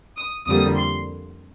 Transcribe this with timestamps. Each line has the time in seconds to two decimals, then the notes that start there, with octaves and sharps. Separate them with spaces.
0.16 D#6
0.47 F2 D3 G3 A#3 D#6
0.77 C6